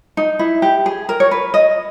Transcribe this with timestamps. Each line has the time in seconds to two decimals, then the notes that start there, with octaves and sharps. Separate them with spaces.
0.17 D#4
0.39 E4
0.62 G4
0.86 G#4
1.09 A#4
1.20 C#5
1.31 B4
1.54 D#5